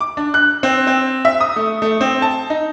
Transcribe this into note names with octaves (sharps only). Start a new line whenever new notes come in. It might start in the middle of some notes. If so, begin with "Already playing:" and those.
D6
D4
F#6
C4
C4
E5
D#6
A3
A3
C4
A5
D#4